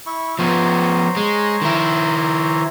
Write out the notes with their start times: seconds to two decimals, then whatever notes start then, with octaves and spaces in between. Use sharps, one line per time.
0.06 E4 C#6
0.39 F3 B3 C5 C#5 A#5
1.17 G#3
1.62 D#3 E4